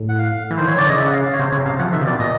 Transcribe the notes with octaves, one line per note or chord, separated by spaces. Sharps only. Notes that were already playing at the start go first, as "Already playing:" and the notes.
Already playing: A2
F#5
F5
E3
D#3 C5
E3 C#5
D3 D5
C#3 D#5
E5
F#5
F5
F5
C#5
C3 C5
C#3 C#5
C3 F5
F3 F#5
D#3 E5
C3
B2 D5
A#2 D#5